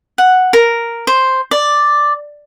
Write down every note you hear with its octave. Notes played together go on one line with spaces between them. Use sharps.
F#5
A#4
C5
D5